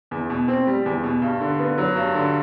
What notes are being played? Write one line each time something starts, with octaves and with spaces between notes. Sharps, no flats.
E2
B2
C4
G3
E2
B2
G2
D3
B3
F#3
G2
D3